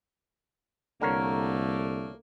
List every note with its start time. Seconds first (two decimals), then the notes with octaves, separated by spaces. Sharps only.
1.02 C2 D3 A3 A#3 A#4 C#5